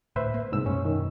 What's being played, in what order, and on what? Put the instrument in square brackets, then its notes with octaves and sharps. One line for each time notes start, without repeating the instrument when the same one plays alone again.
[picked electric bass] D2 A2 [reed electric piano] B4 C5 E5
[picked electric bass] A#3
[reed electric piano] C2 G#2 E6
[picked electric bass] F#2 B2 [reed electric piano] C#4
[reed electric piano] D#3